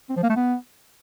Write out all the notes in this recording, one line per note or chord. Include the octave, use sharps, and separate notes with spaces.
C4
F3
A#3
A3
B3